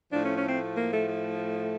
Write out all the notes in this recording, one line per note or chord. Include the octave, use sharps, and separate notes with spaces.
A2 F3 A3 D4
C#4
C#4
C4
A#3
A3
A3